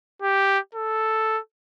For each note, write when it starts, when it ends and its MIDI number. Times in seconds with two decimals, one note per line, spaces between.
0.22 0.59 67
0.75 1.39 69